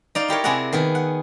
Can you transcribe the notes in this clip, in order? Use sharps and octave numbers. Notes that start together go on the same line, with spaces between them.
D#4 D5 F5
E4 G4 A#4 C#5
C3 E4 G#4 D5 F#5 A#5
D#3 B3 G#4
F#5